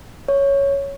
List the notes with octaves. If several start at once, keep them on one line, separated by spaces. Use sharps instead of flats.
C#5